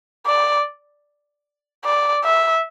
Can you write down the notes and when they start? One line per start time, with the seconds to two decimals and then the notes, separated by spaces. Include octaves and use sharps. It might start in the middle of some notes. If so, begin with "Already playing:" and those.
0.27 D5
1.85 D5
2.24 E5